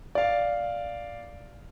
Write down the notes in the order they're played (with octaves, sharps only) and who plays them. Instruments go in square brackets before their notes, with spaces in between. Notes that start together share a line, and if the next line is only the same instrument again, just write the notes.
[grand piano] D5 F5